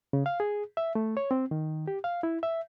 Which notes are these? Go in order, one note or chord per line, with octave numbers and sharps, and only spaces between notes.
C#3
F5
G#4
E5
A3
C#5
C4
D#3
G4
F5
E4
E5